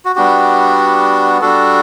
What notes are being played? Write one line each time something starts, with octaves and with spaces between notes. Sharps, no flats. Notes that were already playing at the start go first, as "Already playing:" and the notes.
F#4
G3 B3 D4 F#4 G4
G3 D4 F#4 A4